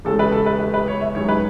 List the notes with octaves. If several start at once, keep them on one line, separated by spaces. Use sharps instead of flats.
E2 C#3 G#3 A4
B4
A4
B4
B4
B4
C#5
E5
F#2 D#3 G#3 C#5
B4